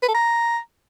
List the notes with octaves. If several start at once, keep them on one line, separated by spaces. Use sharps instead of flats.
B4
A4
A#5